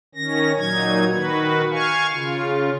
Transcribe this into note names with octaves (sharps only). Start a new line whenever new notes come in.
D#3 C#4 A#6
A#2 F#3 D#4 G#6
D#3 F#4 B4
F5 G#5 C#6
C#3 F4